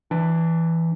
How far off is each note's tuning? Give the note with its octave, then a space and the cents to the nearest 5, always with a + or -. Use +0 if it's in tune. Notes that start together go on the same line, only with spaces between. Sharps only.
E3 +0 D4 +20